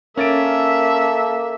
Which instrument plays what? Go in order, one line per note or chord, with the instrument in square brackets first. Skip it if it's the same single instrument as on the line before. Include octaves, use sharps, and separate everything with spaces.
[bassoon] A#3 [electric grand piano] C#4 A6 D7 [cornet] A4 [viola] E5